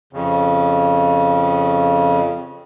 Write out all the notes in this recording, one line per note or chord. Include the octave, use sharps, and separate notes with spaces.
F2 C#3